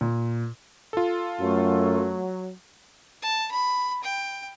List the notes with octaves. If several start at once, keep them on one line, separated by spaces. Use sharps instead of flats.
A#2
F4 A4
F#2 F#3 A3
A5
B5
G5